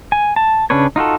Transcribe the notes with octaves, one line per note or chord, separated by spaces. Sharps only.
G#5
A5
C#3 C#4 D4 B4 C#5
D#4 F4 F#4 A4